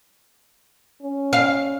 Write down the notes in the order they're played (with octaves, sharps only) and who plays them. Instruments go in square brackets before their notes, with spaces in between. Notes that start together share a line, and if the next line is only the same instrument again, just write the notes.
[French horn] C#4
[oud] F5